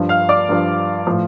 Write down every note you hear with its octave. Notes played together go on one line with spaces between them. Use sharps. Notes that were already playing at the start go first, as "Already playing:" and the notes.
Already playing: G2 F3
F5 F6
D5 D6
G2 F3
A2 F3